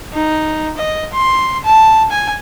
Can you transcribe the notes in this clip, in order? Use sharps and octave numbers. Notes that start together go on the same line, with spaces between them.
D#4
D#5
C6
A5
G#5